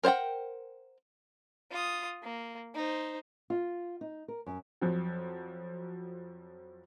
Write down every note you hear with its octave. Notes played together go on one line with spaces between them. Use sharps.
A#4 C5 C#5 F#5 G5
F4 D#6
A#3
D#4 C5
F4
D#4
A#4
F#2
F2 F3 F#3